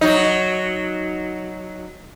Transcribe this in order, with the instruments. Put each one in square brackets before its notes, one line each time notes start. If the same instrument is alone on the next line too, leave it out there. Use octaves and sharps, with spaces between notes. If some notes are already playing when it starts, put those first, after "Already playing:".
[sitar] F#3 D#4